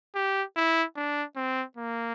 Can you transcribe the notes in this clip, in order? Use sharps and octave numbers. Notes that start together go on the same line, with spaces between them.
G4
E4
D4
C4
A#3